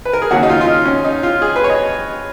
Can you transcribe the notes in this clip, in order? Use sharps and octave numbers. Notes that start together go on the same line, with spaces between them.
B4
A#4
G#4
D#2 C#3 F#3 C#4 F#4
D#4
F4
F4
D#4
C#4
D#4
F4
G#4
B4
C#5
D#5